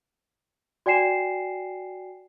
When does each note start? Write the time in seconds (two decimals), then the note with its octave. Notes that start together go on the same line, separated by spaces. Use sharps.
0.86 F#4 D5 G5 G#5 C7 E7